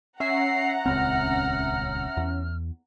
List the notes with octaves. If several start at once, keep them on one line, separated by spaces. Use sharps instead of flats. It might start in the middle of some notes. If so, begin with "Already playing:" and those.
C#4 E5 F#5 A#5 C7
D#1 C#2 C4 F6
E2